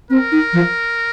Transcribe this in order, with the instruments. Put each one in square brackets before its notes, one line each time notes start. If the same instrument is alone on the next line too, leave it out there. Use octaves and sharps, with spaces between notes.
[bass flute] C4 [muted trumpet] A#4
[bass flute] D#4
F3